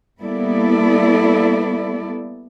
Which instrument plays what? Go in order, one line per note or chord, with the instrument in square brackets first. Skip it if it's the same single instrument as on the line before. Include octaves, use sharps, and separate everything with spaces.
[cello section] G3 A#3 B3 E4 A4 D5